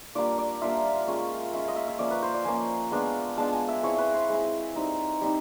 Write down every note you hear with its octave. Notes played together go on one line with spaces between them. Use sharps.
G3 A#3 D4 F4 D5
D5
G3 A#3 D4 F4 E5
G#3 C#4 F4
G#3 C#4 F4 E5
D#5
E5
E5
F3 A#3 C#4 D5
B4
C5
D5
F3 A#3 C#4 G#5
G#3 B3 D4 F4
G#3 B3 D4 F4 A5
G#5
E5
G#3 C4 E4 C#5
B4
C5
G#3 C4 E4
G3 C4 D#4
G3 C4 D#4